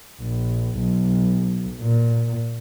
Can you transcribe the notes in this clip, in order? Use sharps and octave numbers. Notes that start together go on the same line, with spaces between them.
A#1
B1
A#2